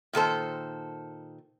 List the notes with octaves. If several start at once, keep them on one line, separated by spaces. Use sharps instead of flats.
A#2 D#3 A4 C5